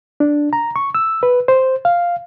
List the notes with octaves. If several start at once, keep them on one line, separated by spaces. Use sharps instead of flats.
D4
A#5
C#6
E6
B4
C5
F5